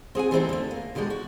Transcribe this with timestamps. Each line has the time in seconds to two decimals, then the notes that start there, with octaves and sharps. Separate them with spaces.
0.15 C4 G#4 F#5 G#5
0.31 E3 G3 A3 C4 D#4 E4
0.49 D3 A3
0.71 A#3
0.95 B2 D3 G3 G#3 G4
1.10 F#4